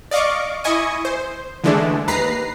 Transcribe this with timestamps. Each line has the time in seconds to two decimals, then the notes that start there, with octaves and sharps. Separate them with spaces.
0.11 D5 D#5 F5 C#6 D6
0.64 E4 D#5 G#5 C#6 D#6
1.05 C5
1.64 D3 E3 G#3 A3 D4
2.08 D#2 B4 A#5 C7